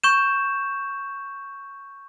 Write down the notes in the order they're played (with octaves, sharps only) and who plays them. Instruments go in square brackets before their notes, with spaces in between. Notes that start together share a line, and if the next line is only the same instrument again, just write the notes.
[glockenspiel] C#6 G6 E7